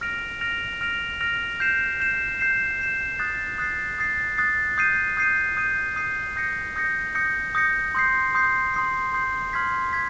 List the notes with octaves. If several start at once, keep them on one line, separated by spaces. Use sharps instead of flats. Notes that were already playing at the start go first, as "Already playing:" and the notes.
F6 A#6 D7 F7
F6 A#6 D7 F7
F6 A#6 D7 F7
F6 A#6 D7 F7
G6 C7 E7
G6 C7 E7
G6 C7 E7
G6 C7 E7
D#6 F#6 A6 C7
D#6 F#6 A6 C7
D#6 F#6 A6 C7
D#6 F#6 A6 C7
D#6 G6 C7 D#7
D#6 G6 C7 D#7
D#6 G6 C7 D#7
D#6 G6 C7 D#7
D#6 G6 A#6 C#7
D#6 G6 A#6 C#7
D#6 G6 A#6 C#7
D#6 G6 A#6 C#7
C6 D#6 G6 C7
C6 D#6 G6 C7
C6 D#6 G6 C7
C6 D#6 G6 C7
C6 F6 G#6 B6
G#6 B6